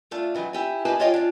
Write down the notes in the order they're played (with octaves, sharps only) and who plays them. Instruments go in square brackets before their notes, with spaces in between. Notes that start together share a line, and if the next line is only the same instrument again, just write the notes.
[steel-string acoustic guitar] A3 D4 F4
D#3 E3 F#3
E4 G4 G#5
G4 B4 D#5 F5 G#5 A5
F4 G4 C#5 D#5 F5 G5
D4 F4